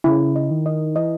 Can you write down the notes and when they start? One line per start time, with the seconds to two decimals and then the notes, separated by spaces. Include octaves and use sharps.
0.04 C#3 E4
0.36 D#5
0.51 D#3
0.66 D#5
0.96 E3 D#5